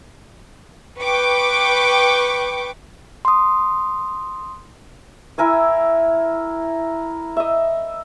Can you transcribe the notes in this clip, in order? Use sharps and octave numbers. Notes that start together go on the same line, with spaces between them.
B4 G5 C#6 D6
C6 D#6
E4 A#4 G#5 E6
D#5 E5